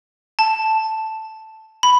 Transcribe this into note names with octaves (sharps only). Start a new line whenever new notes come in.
A5
B5